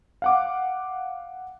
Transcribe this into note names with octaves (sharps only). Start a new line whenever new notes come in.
F5 F#5 D6